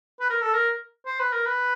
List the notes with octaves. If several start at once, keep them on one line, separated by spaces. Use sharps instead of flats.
B4
A#4
A4
A#4
C5
B4
A#4
B4